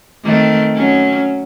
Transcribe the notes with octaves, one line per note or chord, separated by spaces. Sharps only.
D#3 A3 C4
F#3 C#4